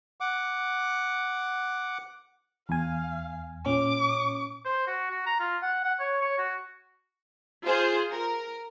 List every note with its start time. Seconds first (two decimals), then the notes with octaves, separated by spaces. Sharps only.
0.21 F#5 D6
2.69 E2 F5 G#5
3.66 A#2 C#4 D6
4.65 C5
4.87 F#4
5.10 F#4
5.26 A#5
5.39 F4
5.62 F#5
5.84 F#5
6.00 C#5
6.21 C#5
6.38 F#4
7.64 F4 G#4 C5
8.10 A#4